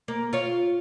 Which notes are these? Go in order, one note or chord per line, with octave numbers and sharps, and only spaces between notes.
A#3
F4 C#5